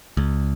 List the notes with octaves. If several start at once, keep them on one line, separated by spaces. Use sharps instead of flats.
C#2